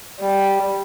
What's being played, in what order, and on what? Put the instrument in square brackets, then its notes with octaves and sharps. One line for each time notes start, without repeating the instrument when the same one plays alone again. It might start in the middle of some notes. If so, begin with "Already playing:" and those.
[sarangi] G3